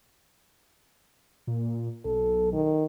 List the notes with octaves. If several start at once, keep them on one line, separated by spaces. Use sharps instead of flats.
A#2
B1 A4
D#3